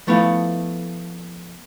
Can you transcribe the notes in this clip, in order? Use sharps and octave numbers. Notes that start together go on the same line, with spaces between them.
F3 A3 B3 E4 F5